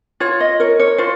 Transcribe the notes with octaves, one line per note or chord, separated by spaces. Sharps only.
F4 C#5
D#5
A#4 C#5
C#5
F4 C5